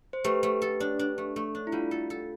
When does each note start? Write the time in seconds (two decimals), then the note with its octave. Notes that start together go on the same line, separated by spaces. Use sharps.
0.13 C5
0.24 A3 G4 B4
0.43 A3
0.62 A4
0.80 D4
0.99 D4
1.18 A3
1.36 A3
1.55 D4
1.67 E4
1.72 G3 F4
1.91 A4
2.10 A4